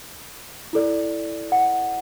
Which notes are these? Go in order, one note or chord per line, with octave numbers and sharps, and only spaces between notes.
E4 A4 D5
F#5